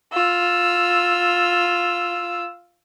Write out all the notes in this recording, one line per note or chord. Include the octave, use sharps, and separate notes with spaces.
F4 E6